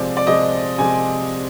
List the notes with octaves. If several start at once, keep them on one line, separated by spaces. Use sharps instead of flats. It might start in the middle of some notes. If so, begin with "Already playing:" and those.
Already playing: C3 F3 G#3 D5
D5
C3 F3 G#3 D#5
C3 F3 G#3 G#5